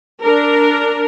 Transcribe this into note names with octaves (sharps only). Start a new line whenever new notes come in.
D4 A#4